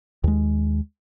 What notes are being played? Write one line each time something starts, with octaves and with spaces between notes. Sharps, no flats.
D#2 G#3